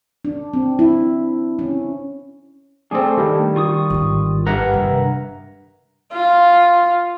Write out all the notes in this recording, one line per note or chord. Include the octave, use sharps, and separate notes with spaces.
D4
C4
E4
C#4
A3 C4 D4 G#4
D#3 G3
F4 C#6 D#6
G#1 E3
G2 A#4 B4 E5 F#5 A#5
C3 D#3
F4